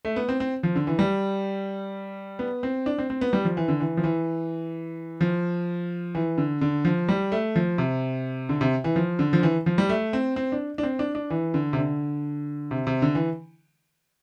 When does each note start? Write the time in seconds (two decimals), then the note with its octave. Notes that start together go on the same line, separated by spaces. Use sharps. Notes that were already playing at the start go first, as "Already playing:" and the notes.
0.05 A3
0.16 B3
0.29 C4
0.40 C4
0.63 F3
0.76 D3
0.87 E3
0.99 G3
2.39 B3
2.63 C4
2.86 D4
2.99 C4
3.10 C4
3.21 B3
3.33 G3
3.45 F3
3.57 E3
3.68 D3
3.80 E3
3.97 F3
4.04 E3
5.21 F3
6.15 E3
6.38 D3
6.61 D3
6.85 F3
7.09 G3
7.32 A3
7.56 F3
7.78 C3
8.49 D3
8.61 C3
8.84 E3
8.96 F3
9.19 D3
9.33 F3
9.43 E3
9.66 F3
9.78 G3
9.89 A3
10.13 C4
10.36 C4
10.52 D4
10.78 D4
10.83 C4
10.99 D4
11.15 D4
11.30 E3
11.54 D3
11.73 C3
11.77 D3
12.71 C3
12.87 C3
13.02 D3
13.15 E3